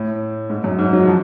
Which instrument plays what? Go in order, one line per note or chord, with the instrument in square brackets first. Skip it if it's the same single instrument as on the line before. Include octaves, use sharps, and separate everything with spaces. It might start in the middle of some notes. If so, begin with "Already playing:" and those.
Already playing: [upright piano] A2
G#2
F#2
G#2
F#3
F3